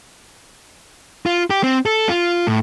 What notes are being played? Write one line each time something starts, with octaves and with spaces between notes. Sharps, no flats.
F4
G4
C4
A4
F4
A2